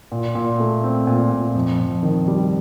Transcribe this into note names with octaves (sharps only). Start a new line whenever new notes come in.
A#2
A#2
A3
C4
A#2
A#2
F2
F2
D#3
G3